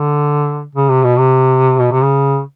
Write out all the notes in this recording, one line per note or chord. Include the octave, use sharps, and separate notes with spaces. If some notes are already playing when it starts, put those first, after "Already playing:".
Already playing: D3
C#3
C3
B2
C3
B2
C3
C#3